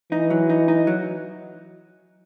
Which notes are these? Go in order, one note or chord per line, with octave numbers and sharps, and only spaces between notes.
E3 D#4
F#3
D#4
D#4
F#3